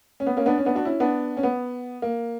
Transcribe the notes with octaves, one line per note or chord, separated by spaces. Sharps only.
C#4
B3
A#3 C#4
B3 D4
C#4
B3 D4
D4 F#4
C#4 E4
B3 D4
C#4
B3
A#3